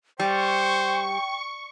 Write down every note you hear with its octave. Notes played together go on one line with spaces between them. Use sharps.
G3 C5 G5 C#6